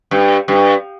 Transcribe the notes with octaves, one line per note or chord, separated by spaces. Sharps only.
G2
G2